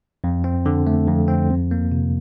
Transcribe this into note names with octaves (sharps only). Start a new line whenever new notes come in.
F2
C4
D3
A3
F2
C4
F2
A#3
C3